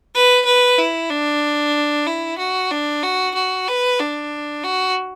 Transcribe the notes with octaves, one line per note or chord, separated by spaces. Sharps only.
B4
B4
E4
D4
E4
F#4
D4
F#4
F#4
B4
D4
F#4